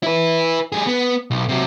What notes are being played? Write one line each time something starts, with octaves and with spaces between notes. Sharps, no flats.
E4 B4
G3 G#4
B3
B1
C3 F#3